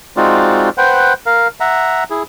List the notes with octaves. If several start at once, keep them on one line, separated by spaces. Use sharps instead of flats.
G#3 C4 D#4 F4 F#4 D5
B4 C5 F#5 G5
A#4 F5
E5 F#5 A#5
E4 G#4